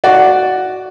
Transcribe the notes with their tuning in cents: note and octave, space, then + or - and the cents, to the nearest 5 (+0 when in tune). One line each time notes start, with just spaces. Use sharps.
F#4 +5 D5 +0